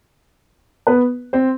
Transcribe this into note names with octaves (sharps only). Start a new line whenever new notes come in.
B3 B4
C4 C5